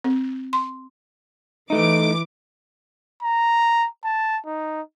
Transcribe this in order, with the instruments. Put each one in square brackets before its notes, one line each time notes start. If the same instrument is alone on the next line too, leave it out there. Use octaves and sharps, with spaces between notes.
[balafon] C4
C6
[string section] E3 D6 [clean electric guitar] A3 D#4
[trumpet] A#5
A5
D#4